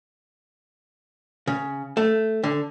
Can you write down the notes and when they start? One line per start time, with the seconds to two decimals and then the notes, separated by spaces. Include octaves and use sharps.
1.47 C#3
1.97 A3
2.44 D3